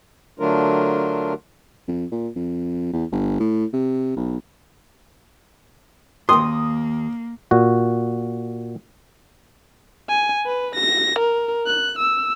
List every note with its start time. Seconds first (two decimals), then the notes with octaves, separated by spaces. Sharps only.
0.39 D3 F#3 A3 D4 F4 A#4
1.88 F2
2.12 A#2
2.36 F2
2.93 E2
3.12 G1
3.40 A2
3.73 C3
4.17 B1
6.29 D#2 A#3 C6 D#6
7.51 A#2 F#4
10.09 G#5
10.46 B4
10.75 A#6
11.19 A#4
11.67 F#6
11.99 E6